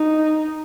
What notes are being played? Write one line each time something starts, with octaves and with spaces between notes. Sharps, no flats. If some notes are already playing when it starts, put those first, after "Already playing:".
Already playing: D#4